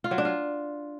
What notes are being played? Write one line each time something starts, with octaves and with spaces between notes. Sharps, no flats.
F4
F#3
D4
F4